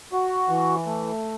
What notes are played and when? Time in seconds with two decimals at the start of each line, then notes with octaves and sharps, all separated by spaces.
0.13 F#4
0.49 E3
0.86 A3